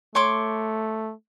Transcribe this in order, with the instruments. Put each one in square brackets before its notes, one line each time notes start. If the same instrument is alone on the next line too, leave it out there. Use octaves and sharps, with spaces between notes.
[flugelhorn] A3 [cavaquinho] C#5 C6 D6